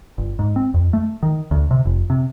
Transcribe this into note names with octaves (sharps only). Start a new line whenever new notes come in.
G1
G#2
C4
F2
A3
D#3
D2
C3
F1
C3